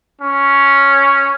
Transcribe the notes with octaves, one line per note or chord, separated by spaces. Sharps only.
C#4